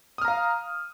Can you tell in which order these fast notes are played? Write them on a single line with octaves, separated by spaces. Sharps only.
D#6 F6 A#5 F5